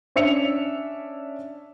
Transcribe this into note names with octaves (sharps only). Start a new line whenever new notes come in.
C#4 D4 E5 C#7 F7